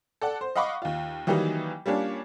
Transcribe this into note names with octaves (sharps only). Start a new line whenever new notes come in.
A4 D5 F#5
C5
D#5 F5 F#5 B5 C#6 D6
D#2 F4
D#3 E3 F#3 G3 A#3 D#4
G3 A#3 C#4 D4 F4